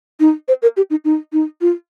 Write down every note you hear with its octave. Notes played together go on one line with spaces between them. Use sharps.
D#4
C5
A#4
G4
D#4
D#4
D#4
F4